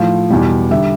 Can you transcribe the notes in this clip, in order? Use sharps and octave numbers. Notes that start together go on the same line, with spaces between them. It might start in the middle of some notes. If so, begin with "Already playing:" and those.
Already playing: A2 F3
E2 B2 G3
D3 G3 E5